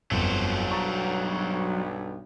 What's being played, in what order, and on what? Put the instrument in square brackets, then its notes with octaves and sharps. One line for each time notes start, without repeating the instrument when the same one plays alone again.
[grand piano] G1 F2 [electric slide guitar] F#3 A4 C5
[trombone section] B1 G2 [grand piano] A5 A#5 C#6